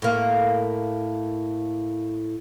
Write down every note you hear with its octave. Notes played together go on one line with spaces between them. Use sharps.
A2 A#3